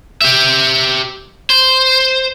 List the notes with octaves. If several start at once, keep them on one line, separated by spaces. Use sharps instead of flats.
G4 E5
C5